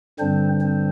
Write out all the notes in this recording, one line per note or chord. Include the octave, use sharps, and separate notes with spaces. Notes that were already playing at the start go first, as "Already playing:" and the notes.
G2 D3 G3 C4 D4 C5
C4 C5